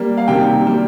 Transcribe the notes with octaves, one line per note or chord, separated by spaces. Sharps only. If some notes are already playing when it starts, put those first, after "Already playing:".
Already playing: G3 A#3
F5
C3 D#3 G3 A#3 G5
G3 A#3